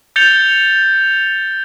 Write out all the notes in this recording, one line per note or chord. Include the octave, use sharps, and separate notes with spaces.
G6 A6 C#7 F7 G7